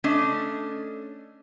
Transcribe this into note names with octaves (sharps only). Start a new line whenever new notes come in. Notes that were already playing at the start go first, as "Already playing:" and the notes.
A3 C#4 D4 D#5